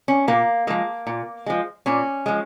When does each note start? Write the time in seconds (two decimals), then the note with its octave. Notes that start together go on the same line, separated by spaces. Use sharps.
0.08 C#4
0.28 A#2 A#3
0.67 F3 G#3 A#3
1.07 A#2
1.46 F3 G#3
1.86 A#2 C#4
2.26 F3 G#3